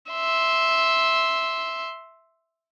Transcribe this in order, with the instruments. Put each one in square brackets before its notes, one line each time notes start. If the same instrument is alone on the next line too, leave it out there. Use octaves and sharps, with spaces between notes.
[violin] E5 C6